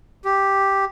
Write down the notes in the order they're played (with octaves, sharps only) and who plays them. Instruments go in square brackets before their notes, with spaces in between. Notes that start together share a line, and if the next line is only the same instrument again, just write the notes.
[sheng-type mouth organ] G4